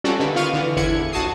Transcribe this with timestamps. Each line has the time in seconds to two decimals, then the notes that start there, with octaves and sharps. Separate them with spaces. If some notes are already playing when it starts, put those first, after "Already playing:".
0.04 G3 C4 C#4 F4 F#4 A4
0.20 D3 D#3 B4
0.35 B3 F4 F5 C#6 F6 D#7
0.53 D3 E3
0.76 G1 E2 D3 E4 G#6 C#7
1.12 A#1 F#4 A5 C#6 D#6 C7